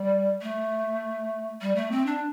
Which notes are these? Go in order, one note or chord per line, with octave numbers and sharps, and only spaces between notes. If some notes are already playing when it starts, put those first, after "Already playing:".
Already playing: G3
A3
G3
A3
C4
D4